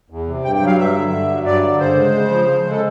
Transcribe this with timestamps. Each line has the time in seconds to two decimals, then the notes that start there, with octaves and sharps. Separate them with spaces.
0.10 E2
0.27 C3
0.44 G2 G5
0.55 G5
0.61 F#3
0.66 F5
0.78 G2 E5
0.95 D3
1.12 G2
1.29 F#3
1.46 G2 D5
1.63 D3
1.80 C#3 C5
1.96 G#3
2.13 C#3
2.30 F3
2.47 C#3
2.64 G#3
2.71 A4